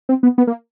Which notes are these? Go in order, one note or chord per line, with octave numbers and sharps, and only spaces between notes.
C4
B3
B3
A#3